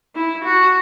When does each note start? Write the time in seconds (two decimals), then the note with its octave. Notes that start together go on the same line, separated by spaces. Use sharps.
0.15 E4
0.44 F#4